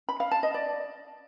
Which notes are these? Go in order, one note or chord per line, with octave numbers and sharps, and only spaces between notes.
B5
F5
A5
D#5
D5